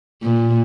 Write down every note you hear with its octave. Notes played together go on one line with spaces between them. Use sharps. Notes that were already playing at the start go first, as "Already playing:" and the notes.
A#2